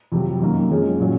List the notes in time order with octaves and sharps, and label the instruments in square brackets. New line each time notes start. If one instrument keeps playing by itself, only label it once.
[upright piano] F2 C3 F#3
F#2 D#3 A#3
F#2 F3 G#3 C#4
A#2 F#3 C#4